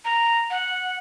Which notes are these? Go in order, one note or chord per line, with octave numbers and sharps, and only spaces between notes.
A#5
F#5